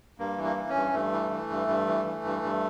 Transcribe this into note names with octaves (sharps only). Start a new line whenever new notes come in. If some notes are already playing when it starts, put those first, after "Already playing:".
G2 A#3
E3
A#3
E3
C#4
G2
G2 A3
E3
E3
G2
G2
E3
E3
G2
G2